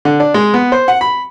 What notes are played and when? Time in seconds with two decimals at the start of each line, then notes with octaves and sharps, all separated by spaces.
0.05 D3
0.20 D4
0.34 G#3
0.54 B3
0.72 C5
0.88 F#5
1.01 B5